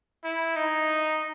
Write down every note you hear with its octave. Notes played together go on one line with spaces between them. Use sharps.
E4
D#4